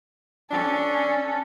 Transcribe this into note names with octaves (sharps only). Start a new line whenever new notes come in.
C#4 D4 A4